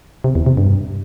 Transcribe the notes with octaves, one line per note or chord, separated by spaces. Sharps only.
C3
E2
C3
G2